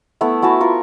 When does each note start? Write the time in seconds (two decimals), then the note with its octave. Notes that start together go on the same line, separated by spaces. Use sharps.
0.21 A3 B3 E4 E5
0.42 E4 F#4 G#5 A5
0.61 F4 A#4 C#6